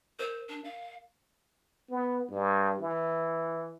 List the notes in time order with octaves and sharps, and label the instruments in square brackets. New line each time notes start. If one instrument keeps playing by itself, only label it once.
[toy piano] A#4 [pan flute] C5
[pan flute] D4
F5
[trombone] B3
G2
E3